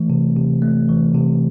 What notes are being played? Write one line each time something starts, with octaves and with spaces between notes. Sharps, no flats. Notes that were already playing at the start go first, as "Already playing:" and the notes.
Already playing: E3 A3
C3
C3
A3
E3
C3